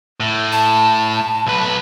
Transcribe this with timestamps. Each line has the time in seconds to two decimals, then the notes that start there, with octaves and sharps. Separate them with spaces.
0.20 A2
0.52 A5
1.47 B1 B4